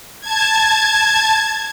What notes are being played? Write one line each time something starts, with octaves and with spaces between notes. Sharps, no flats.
A5 G#6